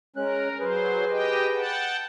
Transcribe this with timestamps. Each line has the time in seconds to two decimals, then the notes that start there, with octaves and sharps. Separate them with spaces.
0.16 G#3 C#4 A#4 F#6
0.60 F#3 G#4 B4 C5
1.10 G4 D#5 G5
1.56 F#5 G5 A5